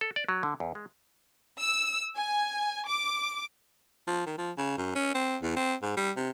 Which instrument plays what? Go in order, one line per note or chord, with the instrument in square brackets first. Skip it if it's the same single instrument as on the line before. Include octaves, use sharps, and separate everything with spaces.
[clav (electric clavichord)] A4
D5
F#3
D3
E2
G#3
[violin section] E6
G#5
D6
[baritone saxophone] F3
D#3
F3
C#3
F#2
C#4
C4
E2
C4
G#2
G3
C3